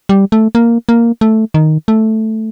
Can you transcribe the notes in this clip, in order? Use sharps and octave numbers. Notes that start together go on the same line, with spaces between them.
G3
A3
A#3
A#3
A3
D#3
A3